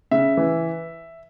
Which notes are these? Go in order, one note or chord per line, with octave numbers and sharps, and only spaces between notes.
C#3 E5
E3